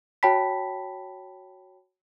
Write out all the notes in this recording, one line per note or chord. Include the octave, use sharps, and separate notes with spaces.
F#4 C#5 G5 A5 B5 B6